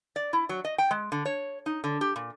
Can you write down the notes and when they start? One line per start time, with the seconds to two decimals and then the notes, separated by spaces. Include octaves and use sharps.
0.16 D5
0.33 E4
0.49 F#3
0.65 D#5
0.78 G5
0.91 G#3
1.12 D3
1.26 C#5
1.66 D#4
1.84 D3
2.01 G4
2.16 A#2